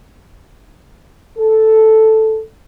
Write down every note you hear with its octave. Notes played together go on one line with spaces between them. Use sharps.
A4